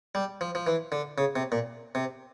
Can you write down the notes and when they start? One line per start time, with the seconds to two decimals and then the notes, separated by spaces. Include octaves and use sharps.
0.15 G3
0.41 F3
0.55 F3
0.67 E3
0.92 D3
1.18 C#3
1.36 C3
1.52 A#2
1.95 C3